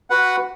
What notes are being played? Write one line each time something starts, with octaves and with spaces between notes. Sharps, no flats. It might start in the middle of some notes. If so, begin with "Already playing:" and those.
F#4 B4 F#5